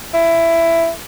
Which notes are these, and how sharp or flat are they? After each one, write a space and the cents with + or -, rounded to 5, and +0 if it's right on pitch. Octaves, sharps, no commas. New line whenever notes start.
E4 +15